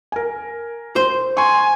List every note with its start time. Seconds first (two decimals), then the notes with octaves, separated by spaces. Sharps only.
0.12 A#4 G#5
0.96 C5
1.37 G#5 C6 C#6